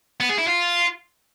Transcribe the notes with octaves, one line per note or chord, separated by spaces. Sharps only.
B3
G#4
E4
F4